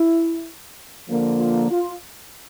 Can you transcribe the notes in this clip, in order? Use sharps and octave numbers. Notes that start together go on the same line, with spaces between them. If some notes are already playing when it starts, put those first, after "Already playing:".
Already playing: E4
D3 F3 A#3
F4
F4